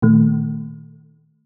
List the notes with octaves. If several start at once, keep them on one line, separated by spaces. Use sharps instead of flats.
A#2 D#3 A3